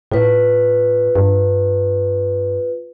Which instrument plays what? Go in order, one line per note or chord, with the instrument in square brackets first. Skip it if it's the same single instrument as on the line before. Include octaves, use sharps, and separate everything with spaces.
[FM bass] A2 [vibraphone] F4 B4
[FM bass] G2